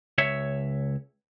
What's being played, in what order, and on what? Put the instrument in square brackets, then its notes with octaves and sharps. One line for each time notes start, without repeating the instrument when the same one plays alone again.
[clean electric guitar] C#2 C#5 E5